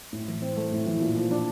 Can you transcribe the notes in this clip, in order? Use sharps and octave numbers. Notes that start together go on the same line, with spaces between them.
A2
E3
C4
A3
A2
E3
A#2
F3
D4